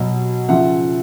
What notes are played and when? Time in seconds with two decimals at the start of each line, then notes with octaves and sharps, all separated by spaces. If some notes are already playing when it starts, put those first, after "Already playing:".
Already playing: B2 F#3 D#5
0.49 C#3 F3 E5 F#5